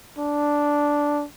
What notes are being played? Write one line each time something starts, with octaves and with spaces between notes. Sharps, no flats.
D4